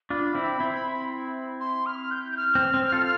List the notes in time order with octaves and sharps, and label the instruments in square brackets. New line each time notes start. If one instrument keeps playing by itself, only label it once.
[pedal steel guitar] D4 F4 [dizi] B5
[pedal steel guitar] C4 E4
C4 E4
[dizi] C6
F6
G6
G6
F6
[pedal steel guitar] C4
C4
F4 A4